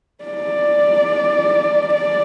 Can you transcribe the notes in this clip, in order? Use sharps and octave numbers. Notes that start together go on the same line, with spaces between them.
D5
D5